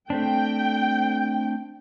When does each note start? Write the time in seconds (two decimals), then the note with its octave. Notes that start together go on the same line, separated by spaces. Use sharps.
0.10 A3 C4 D4 G5